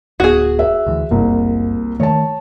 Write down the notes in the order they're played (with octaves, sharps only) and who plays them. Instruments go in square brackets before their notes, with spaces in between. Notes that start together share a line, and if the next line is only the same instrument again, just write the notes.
[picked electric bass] D1 B3 [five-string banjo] F#4 G#4
[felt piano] E5
[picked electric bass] D2 D#3 E3
[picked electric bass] F#1 [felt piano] C2 A#3
[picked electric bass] D#3 A3 [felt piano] C#5 A5